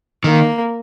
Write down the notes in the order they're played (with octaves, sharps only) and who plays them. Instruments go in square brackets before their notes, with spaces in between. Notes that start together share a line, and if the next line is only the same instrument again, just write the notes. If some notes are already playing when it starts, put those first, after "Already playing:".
[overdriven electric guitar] D#3 [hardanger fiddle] A#3